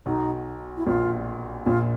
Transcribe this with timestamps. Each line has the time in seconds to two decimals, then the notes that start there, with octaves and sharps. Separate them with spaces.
0.06 B1 B2 D#4
0.77 E4
0.86 A#1 A#2 F4
1.66 A#1 A#2 F4